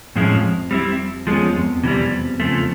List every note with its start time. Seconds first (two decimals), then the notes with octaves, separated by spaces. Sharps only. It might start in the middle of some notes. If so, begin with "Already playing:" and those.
0.15 F2 A2 F3 G#3 C#4 E4
0.71 G3 C4 E4
1.27 E2 F3 G#3 C#4
1.56 F2
1.84 C3 E3 G3
2.40 C#3 F3 A3